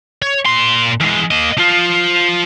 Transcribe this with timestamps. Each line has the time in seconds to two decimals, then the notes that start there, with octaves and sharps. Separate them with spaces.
0.22 C#5
0.46 A#2 C6
1.01 E2 G#3
1.31 A#3 D#5
1.58 F3 F4